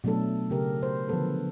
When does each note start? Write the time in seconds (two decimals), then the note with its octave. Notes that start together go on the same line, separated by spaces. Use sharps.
0.04 B2 F#3 A3 D4 A4
0.50 C#3 G4 A#4
0.83 C5
1.08 D3 F3 F#3 B3 A4 B4